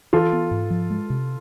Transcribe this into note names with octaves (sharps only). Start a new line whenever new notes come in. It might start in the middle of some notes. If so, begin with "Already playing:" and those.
E3 F4 A4
B3
G#2
F3
G#3
C3